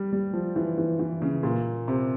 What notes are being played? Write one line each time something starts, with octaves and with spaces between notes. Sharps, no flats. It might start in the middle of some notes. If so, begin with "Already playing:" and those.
Already playing: G3
G3
F3
E3
E3
E3
C#3
A#2
C3